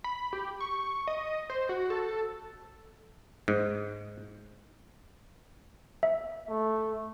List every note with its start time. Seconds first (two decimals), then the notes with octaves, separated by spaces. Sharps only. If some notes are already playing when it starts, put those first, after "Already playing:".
0.04 B5
0.33 G4
0.61 C#6
1.08 D#5
1.50 C5
1.69 F#4
1.90 A4
3.48 G#2
6.03 E5
6.49 A3